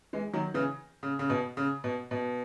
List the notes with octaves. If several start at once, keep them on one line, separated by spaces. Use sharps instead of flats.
E3 G#3
D#3 F#3
C#3 E3
C#3
C#3
B2
C#3
B2
B2